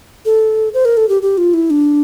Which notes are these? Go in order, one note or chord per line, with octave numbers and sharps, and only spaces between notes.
A4
C5
A#4
A4
G4
G4
F4
E4
D4